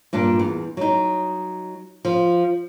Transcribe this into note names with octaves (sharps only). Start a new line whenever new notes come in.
G2 A#2 D4
E2
F#3 D#4
F3